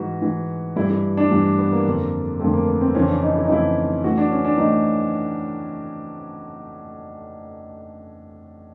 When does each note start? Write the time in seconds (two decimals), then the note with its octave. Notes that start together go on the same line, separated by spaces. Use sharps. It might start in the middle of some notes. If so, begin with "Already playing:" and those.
Already playing: G#2 E3 F#4
0.22 G#2 E3
0.76 G2 E3 E4
0.90 E4
1.17 D4
1.31 G2 E3
1.58 B3
1.72 A#3
1.86 F2 D3
2.39 F2 D3 A3
2.53 A#3
2.67 B3
2.81 C4
2.95 F2 C#3 E3 C#4
3.08 D4
3.22 D#4
3.35 E4
3.44 D#4
3.49 F2 C#3 E3 E4
4.04 A2 E3 F#4
4.18 D4
4.31 C#4
4.44 D4
4.58 A2 E3 D#4